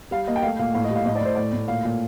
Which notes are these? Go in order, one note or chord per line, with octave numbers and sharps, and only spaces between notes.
G3 F5
A#3 D#5
G5
A3 F5
A#2 F5
A2 F5
D#5
G3
F5
A2 D#5
D5
A2 C5
A2 D5
A2
A#2 F5
A#2